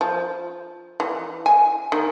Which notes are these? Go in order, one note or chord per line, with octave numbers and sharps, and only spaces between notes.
F3
E3
G#5
D#3